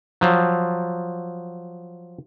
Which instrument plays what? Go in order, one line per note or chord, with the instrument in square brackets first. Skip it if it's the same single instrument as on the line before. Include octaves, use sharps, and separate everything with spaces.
[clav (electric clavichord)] F3 F#3